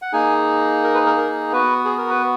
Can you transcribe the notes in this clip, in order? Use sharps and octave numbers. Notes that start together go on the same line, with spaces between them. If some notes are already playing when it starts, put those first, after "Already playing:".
F#5
A#3 D#4 G#4 G#5
A#4
B4
A#4
A#4
B3 F#4 B4
G#4
A#4
B4